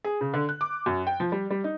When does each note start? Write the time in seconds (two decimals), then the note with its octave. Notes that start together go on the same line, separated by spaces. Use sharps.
0.04 G#4
0.21 C#3
0.34 D3
0.49 F#6
0.61 D6
0.86 F#2
1.07 G5
1.20 F3
1.32 G3
1.50 G3
1.64 D#4